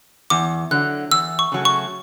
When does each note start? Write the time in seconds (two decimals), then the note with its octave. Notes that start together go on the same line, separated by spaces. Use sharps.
0.30 E2 D6
0.71 D3 F#3 F#6
1.11 E2 E6
1.39 C#6
1.52 C#3 F#3 A3
1.65 C#6